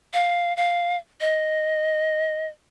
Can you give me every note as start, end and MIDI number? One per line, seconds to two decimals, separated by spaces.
0.14 0.55 77
0.57 0.97 77
1.21 2.47 75